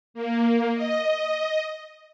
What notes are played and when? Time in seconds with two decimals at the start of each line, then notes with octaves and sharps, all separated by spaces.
0.14 A#3
0.74 D#5